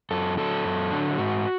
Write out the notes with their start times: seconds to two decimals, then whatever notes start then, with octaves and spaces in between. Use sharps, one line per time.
0.11 F#2 A4
0.37 D3 F#3 A4
0.65 F#2
0.91 D3 F#3
1.18 G#2 F#4